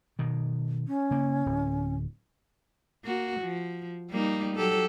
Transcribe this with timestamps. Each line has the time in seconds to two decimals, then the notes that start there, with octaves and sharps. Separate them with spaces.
0.19 B2 D#3
0.87 C#4
1.11 C#3 A#3
1.46 D1
3.04 A#3 F#4
3.40 F3
4.11 G3 A#3 D#4
4.56 F#3 G4 A4